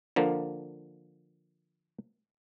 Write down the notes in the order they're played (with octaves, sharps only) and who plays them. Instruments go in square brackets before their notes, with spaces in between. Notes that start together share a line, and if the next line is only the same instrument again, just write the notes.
[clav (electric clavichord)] D3 F3 A#3